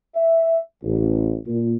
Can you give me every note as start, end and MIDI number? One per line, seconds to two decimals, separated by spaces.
0.15 0.58 76
0.84 1.36 33
1.46 1.76 46